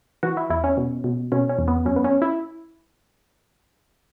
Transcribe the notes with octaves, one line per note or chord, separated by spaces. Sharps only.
E3 F#4
E4
E2 E4
C#4
B2
B2
B2 C#4
C#4
E2
B3
F#2 C#4
B3
C#4
E4